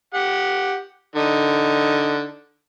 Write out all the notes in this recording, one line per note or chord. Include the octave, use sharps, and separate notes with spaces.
G4 F#5
D3 D#4